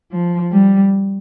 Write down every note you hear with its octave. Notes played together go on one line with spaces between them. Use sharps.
F3
G3